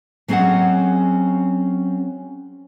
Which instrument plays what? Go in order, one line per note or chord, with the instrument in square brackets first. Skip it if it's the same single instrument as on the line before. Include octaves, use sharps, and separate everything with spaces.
[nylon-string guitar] F#3 C4 C#4 G#4 D#5 F#5